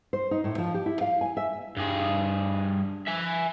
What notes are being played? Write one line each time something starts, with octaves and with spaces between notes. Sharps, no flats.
C5
D#4
A2
F3
G4
E4
F5
G#5
E5
G2 G#4
E5 G#5